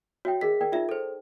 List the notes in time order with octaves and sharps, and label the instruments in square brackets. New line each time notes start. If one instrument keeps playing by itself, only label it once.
[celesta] F#4 [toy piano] C#5 E5 G5
[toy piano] G#4 A#4 D#5 [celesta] B6
[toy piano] A#4 D5 G5
[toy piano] D#4 D5 [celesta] F4 E5
[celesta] A4 C5